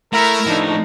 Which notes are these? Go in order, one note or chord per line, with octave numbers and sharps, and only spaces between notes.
A3 E4 A#4 A#5
A2 F3 D4 D#4